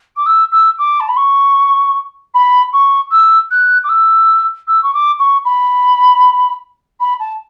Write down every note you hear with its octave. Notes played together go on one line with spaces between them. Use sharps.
D6
E6
E6
D6
A5
B5
C#6
B5
C#6
E6
F#6
D6
E6
E6
C#6
D6
C#6
B5
B5
A5